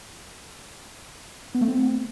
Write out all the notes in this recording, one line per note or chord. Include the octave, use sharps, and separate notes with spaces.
B3
A3
C4